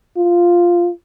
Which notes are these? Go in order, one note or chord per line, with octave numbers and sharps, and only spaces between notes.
F4